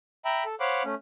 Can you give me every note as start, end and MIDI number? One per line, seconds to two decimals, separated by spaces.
0.25 0.44 76
0.25 0.44 79
0.25 0.44 82
0.25 0.44 83
0.45 0.55 69
0.60 0.83 72
0.60 0.83 73
0.60 0.83 77
0.60 0.83 78
0.60 0.83 83
0.60 0.83 86
0.84 0.95 57
0.84 0.95 61